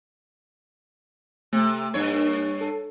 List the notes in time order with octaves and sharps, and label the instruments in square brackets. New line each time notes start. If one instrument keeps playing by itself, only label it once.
[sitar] C3 [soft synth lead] A3
[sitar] G2 C#5 [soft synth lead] A#3
[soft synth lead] A4